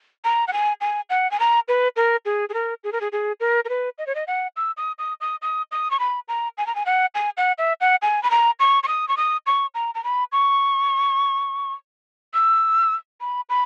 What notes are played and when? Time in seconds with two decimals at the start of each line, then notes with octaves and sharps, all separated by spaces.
0.24 A#5
0.48 F#5
0.53 G#5
0.81 G#5
1.10 F#5
1.31 G#5
1.40 A#5
1.68 B4
1.96 A#4
2.25 G#4
2.49 G#4
2.54 A#4
2.84 G#4
2.92 A#4
3.01 G#4
3.12 G#4
3.40 A#4
3.65 A#4
3.69 B4
3.98 D#5
4.07 C#5
4.15 D#5
4.27 F#5
4.56 E6
4.77 D#6
4.99 D#6
5.21 D#6
5.42 D#6
5.72 D#6
5.91 C#6
5.99 B5
6.28 A#5
6.58 G#5
6.67 A#5
6.75 G#5
6.86 F#5
7.15 G#5
7.37 F#5
7.58 E5
7.81 F#5
8.02 G#5
8.23 B5
8.31 A#5
8.59 C#6
8.83 C#6
8.88 D#6
9.08 C#6
9.17 D#6
9.46 C#6
9.75 A#5
9.95 A#5
10.04 B5
10.32 C#6
12.34 E6
13.21 B5
13.49 B5